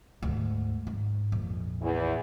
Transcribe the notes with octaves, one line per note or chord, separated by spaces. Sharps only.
D2 G#2
G#2
A#1 F2
E2 E3